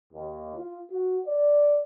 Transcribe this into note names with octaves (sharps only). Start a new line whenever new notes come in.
D#2
F4
F#4
D5